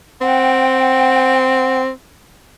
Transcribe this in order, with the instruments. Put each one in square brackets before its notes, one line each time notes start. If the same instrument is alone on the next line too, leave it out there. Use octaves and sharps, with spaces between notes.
[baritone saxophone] C4 [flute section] F#5 G5